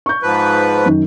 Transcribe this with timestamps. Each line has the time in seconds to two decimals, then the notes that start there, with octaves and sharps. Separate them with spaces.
0.06 C#6 G6
0.23 G#2 F3 B4
0.86 F#2 D#3